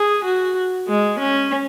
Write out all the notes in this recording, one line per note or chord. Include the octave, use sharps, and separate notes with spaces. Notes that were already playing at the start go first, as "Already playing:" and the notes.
Already playing: G#4
F#4
G#3
C#4